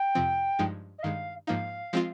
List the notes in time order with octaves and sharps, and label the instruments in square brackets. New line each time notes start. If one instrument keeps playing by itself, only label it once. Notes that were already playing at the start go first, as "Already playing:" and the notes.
Already playing: [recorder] G5
[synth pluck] F2 C3 F3 C4
G2 F3 G#3 D#4
[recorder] D#5
[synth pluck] G2 D#3 G#3 [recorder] F5
[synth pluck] G#2 F3 A#3 D#4 [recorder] F5
[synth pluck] F3 G#3 C4 F4